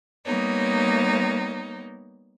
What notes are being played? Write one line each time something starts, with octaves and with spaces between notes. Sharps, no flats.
G3 A#3 B3 D#4 C#5